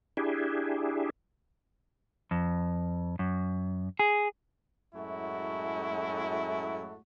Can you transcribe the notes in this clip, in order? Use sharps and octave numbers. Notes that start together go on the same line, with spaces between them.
D4 E4 G4 G#4
F2
F#2
G#4
F#2 A2 G#3 A3 E4 F#4